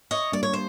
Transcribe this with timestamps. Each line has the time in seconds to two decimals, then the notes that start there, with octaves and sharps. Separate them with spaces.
0.11 C#5 D#5
0.32 G3 A#3 D4 D5
0.43 C#5
0.53 C5